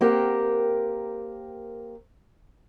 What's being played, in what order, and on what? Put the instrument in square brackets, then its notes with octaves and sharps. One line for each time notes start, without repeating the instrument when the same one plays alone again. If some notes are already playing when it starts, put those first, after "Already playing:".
[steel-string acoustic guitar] A#3 C4 G4 A#4 F#5